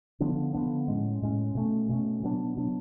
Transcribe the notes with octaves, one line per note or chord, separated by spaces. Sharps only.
D3 F3 B3 D4
D3 F3 B3 D4
A2 G#3 C#4
A2 G#3 C#4
B2 A3 C#4
B2 A3 C#4
B2 F#3 B3 D4
B2 F#3 B3 D4